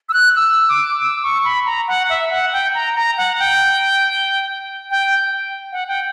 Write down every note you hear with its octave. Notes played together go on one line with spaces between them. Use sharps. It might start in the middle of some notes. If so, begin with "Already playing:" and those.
E6
F#6
E6
D6
E6
C#6
B5
A#5
F#5
E5
F#5
G5
A#5
A#5
F#5
G5
G5
F#5
G5